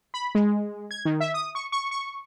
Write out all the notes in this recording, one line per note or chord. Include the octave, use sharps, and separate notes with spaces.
B5
G#3
G#6
D#3
E5
D#6
C#6
C#6
C#6